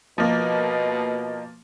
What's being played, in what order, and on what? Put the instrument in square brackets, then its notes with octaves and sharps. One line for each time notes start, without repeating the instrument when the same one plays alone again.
[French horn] B2 [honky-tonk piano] F3 A#3 [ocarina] D#5